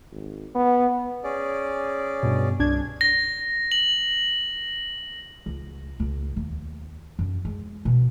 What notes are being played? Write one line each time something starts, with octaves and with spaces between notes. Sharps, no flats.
G#1
B3
C#4 G#4 D5
G2 B2
C2 D4 G#6
A#6
F#7
C#2
C#2
D#2
F#2
G#3
B2